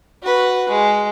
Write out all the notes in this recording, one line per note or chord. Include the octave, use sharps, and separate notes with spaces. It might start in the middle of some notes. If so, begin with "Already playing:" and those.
F#4 B4
G#3